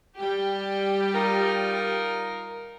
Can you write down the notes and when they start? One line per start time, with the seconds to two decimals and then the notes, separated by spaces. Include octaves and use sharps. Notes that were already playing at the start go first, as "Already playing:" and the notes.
0.19 G3 G4
1.15 D#4 F4 A#4